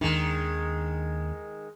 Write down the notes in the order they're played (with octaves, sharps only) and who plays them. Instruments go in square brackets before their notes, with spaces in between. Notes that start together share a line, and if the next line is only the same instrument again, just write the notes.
[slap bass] D#2 D4 [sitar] D#3 G#3